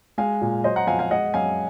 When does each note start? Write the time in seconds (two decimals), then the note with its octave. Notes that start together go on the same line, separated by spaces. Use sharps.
0.18 G#3 F5 G#5
0.41 A#2
0.64 F#3 C5 D#5
0.76 F#5 A#5
0.87 F2 F5 G#5
0.99 F5 G#5
1.11 G#3 D#5 F#5
1.34 F#2 F5 G#5